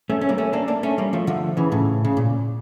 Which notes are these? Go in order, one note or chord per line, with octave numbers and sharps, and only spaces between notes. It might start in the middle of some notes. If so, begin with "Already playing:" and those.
A3 C#4
C#4
G3 A#3
A3 C#4
A#3 D4
A#3 D4
A3 C#4
G3 A#3
F3 A3
D3 F3
C#3 E3
A2 C#3
C#3
A#2